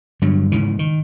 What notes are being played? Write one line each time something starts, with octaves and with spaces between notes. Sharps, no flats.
G2 D3 F#3
G#2 C#3 E3
D#3